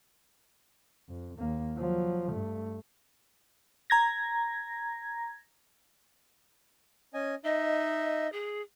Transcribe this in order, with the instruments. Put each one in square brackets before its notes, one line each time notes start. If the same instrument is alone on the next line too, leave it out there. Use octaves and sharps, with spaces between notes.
[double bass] F2
D#2 A#3
F3 F#3
G2 A3
[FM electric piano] A#5 G#6 A#6
[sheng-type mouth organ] C#4 D#5 G#5
[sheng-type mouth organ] D#4 E5 [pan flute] D#5
[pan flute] G#4